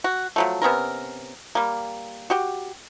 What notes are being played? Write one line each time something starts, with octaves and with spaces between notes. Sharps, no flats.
F#4
F3 F#3 A3
C3 B3 C#4 A#4
G3 A#3
F#4 G4